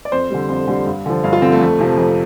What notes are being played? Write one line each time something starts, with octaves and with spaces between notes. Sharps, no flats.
D5
F2 C5
D3 G3
F2
D3 G3
G2
D3 F3
G2 F5
F4
D3 F3 C4
A3
F2
C3 F3
F2